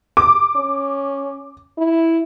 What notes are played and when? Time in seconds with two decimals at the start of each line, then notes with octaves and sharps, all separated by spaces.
0.17 D6
0.56 C#4
1.78 E4